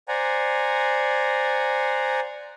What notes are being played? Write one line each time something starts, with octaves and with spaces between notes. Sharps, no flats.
C5 D5 F#5 G#5 A#5